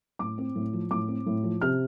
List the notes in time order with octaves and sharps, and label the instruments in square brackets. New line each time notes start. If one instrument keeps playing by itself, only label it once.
[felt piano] A2 D6
C4
A2
F3
A2 D6
C4
A2
F3
C3 F6